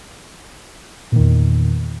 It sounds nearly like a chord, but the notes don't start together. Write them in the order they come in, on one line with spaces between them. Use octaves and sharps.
A#2 D#3 E2